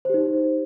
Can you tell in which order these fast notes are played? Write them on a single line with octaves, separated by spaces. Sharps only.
C5 G4 D#4